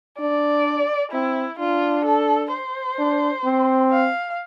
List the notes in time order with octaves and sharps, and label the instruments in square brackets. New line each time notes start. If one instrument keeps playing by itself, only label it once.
[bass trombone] D4 [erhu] D5
[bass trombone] C4 [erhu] E4
[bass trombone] D4 [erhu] F4
[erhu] A4
C5
[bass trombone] D4
C4
[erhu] F5